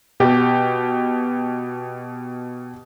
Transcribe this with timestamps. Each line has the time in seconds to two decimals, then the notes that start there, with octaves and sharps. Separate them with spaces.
0.20 B2 G4